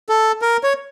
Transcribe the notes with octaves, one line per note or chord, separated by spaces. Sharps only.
A4
A#4
C#5